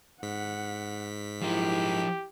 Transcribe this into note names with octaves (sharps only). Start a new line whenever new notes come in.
G#2 F#5 B6
F3 F#3 E4 G4 A#4